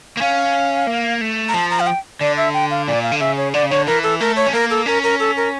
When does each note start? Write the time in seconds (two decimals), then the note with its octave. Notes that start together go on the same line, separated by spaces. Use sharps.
0.17 A#3
0.21 C#4 F5
0.87 A#3
1.21 A3
1.48 A#5
1.54 F3 A5
1.70 A#5
1.80 F5
1.87 G5
2.21 D3 D5
2.37 E5
2.54 G5
2.71 F5
2.87 A#2 D5
3.03 F5
3.12 D3
3.20 C#3 E5
3.37 C#5
3.53 D3 D5
3.63 C#3
3.70 D3 C#5
3.87 E3 A#4
4.03 A4
4.20 A3 A#4
4.36 C#5
4.46 C#4
4.53 A#3 A#4
4.70 A4
4.86 C#4 A#4
5.03 A#4
5.20 A4
5.37 A#4